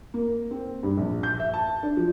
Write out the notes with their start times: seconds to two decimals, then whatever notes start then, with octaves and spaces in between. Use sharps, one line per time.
0.14 A#3
0.51 C4
0.83 G2
0.97 A#1
1.23 G6
1.40 E5
1.54 A5
1.83 D4
1.97 F3